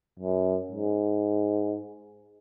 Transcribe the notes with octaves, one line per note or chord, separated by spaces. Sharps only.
F#2
G#2